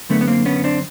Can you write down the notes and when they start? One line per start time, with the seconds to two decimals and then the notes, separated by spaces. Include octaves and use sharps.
0.09 F#2 D3 A3 B3
0.21 B3
0.27 A#3 C4
0.46 B3 C#4
0.64 C4 D4